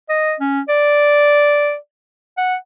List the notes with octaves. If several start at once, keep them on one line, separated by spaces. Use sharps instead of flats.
D#5
C#4
D5
F#5